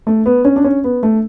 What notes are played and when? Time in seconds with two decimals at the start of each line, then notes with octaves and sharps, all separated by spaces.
0.07 A3
0.26 B3
0.45 C#4
0.56 D4
0.64 C#4
0.84 B3
1.03 A3